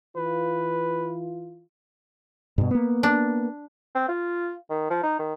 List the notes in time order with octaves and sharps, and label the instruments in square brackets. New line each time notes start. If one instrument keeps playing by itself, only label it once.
[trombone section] E3 F4 [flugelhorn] B4
[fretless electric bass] G2 B2
A#3 B3
[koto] D4
[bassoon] C4
F4
D#3
F3
D#4
D#3